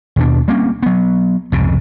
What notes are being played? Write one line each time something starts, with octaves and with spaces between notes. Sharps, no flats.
D#2 B2 D4
G3 A#3 C4 C#4
F#3 B3
C2 F2 G#2 C#3